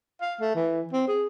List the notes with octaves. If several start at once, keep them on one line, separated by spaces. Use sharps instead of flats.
F5
A3
E3
C4
G#4